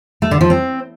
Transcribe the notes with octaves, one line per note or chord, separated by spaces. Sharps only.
A3
D3
F3
C4